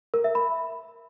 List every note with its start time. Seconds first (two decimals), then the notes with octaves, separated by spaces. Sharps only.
0.14 A#4
0.24 E5
0.35 B5